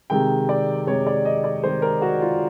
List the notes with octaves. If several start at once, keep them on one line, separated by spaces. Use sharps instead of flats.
C3 D#3 G#3 G5
D5
C3 D#3 G#3 C#5
D5
D#5
D5
C3 D#3 G#3 C5
A#4
F#4
F4